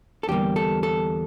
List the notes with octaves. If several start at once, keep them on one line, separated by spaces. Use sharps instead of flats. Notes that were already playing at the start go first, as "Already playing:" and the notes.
A4
E2 D3 G3 A#3 G4
A4
A4